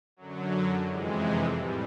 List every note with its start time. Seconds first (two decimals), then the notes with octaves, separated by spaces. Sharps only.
0.17 F#2 D3 F#3
0.85 F2 C3 E3 G#3
1.55 A2 G3